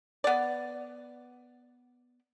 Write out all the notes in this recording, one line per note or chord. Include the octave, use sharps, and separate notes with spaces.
B3 D5